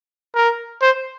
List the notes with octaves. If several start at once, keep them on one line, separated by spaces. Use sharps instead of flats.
A#4
C5